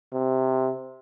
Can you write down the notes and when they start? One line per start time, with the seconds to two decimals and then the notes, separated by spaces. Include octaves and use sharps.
0.14 C3